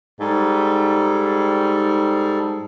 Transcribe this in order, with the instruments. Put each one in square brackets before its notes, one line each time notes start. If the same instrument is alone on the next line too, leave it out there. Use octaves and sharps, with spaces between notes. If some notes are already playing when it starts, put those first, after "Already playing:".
[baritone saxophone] G#2 [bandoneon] G3 A4